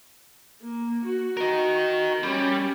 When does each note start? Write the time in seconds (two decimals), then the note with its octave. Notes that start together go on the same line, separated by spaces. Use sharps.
0.62 A#3
1.05 F#4
1.37 A#4 D#5
2.23 G3 C#4